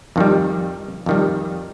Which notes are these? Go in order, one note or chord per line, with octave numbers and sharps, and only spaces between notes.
F2 D#3 G3
F2 D#3 G3